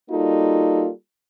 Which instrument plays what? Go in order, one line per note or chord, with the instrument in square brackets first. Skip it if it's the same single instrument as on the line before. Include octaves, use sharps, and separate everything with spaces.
[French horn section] G3 A#3 D#4 F4 F#4 A4